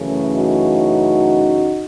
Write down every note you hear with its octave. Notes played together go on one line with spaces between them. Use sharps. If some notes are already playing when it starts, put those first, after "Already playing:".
Already playing: F#2 C#3 E3 A3
D#4 F#4